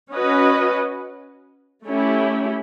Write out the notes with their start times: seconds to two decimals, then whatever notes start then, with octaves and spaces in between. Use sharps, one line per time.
0.11 C#4 F#4 B4 D#5
1.86 A3 C#4 E4 G4